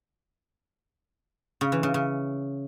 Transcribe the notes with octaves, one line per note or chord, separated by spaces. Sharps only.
C#3
E3
C#3
C#3